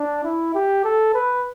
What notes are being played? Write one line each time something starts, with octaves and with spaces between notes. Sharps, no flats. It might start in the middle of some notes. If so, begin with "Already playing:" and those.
Already playing: D4
E4
G4
A4
B4